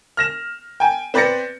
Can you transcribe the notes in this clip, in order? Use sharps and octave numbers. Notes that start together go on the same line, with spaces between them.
F6 A#6 E7
G5 G#5
C4 B4 D5 A6 A#6 C#7